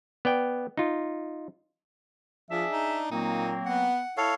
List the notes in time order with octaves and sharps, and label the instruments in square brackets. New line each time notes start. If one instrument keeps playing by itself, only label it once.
[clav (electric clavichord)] B3 D5 G5
D#4 F4
[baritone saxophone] F3 [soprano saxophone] D4 [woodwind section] G#4 E5
[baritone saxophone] D#4
[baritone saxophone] A#2 [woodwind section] F#3 A#3 C4 [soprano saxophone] D#4
[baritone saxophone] B3 [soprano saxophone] F#5
[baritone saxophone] E4 [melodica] A4 C#5 F5